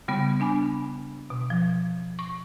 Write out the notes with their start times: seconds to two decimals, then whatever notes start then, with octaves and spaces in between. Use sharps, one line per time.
0.08 C#3 G3 B3
0.40 B3 D4 G#5
1.30 B2
1.50 F3
2.19 C#6